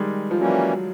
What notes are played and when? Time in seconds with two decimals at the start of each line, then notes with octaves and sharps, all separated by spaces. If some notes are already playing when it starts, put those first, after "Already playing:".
Already playing: D#3 G3 G#3
0.31 F3
0.40 E3 F#3 G3 A#3 C#4